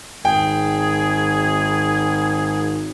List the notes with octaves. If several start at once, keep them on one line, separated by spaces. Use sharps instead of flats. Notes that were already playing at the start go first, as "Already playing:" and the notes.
G#1 G#4 G5